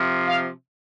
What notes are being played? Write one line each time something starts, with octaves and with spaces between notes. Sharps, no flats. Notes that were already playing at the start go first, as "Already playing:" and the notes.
Already playing: C3 F3
F5